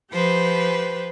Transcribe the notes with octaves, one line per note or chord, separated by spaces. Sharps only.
F3 G4 B4 C5